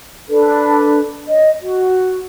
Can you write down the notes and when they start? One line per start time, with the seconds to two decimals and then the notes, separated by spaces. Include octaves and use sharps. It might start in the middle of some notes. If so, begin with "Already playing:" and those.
0.29 D4 A4 B4
1.27 C#5 D#5
1.60 F#4